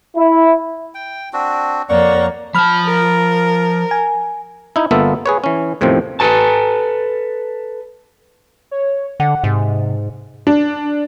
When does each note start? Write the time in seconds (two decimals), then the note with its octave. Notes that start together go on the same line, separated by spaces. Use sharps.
0.17 E4
0.94 G5
1.33 C4 D4 F#4
1.89 F2 A#3 C#5 D5 F#5 C#6
2.54 F3 A5 B5 F6
2.86 A#4
3.91 G#5
4.76 D#4 E4
4.91 G1 A#3 B3 F4 A4 E5
5.26 G#4 B4 C#5
5.44 E3 C#4
5.81 E2 A2 C3 D#3 F3 C4
6.20 A4 B4 A5
8.71 C#5
9.20 D3 F#5
9.44 G#2 C3
10.47 D4